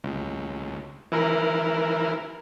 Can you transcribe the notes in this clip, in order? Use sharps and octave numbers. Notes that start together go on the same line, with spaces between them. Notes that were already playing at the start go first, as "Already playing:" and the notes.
C#2
E3 E4 A#4